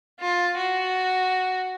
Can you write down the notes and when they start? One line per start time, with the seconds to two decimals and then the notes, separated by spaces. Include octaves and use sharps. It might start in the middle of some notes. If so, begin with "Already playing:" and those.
0.20 F4
0.57 F#4